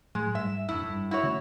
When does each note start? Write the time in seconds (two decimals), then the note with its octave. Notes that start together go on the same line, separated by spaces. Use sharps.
0.15 A2 F#3 G#3 A3
0.35 G#2 G3 E5
0.69 F1 F#2 A2 D4 E4
0.89 G2
1.11 E4 F#4 C#5
1.23 D3 A3 C#4